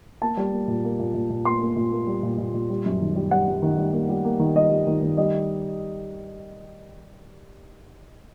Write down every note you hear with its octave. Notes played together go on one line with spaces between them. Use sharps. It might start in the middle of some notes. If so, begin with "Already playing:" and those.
A#3 A5
G3
A#3
A#2
A#3
A#2
A#2
A#2
A#3 C6
A#3
A#2
A#3
G3
A#2
A#2
A#2
G3
F#2
D#3
G3
G3 F#5
G3
D#3
G3
A#3
G3
A#3
D#3
G3 D#5
G3
D#3
D#3
G3 D#5